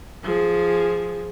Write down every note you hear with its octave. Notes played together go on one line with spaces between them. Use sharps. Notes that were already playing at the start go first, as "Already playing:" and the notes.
F3 G#4